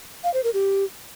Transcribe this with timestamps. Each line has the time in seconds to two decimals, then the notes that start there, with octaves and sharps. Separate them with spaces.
0.24 F5
0.34 C5
0.44 A#4
0.54 G4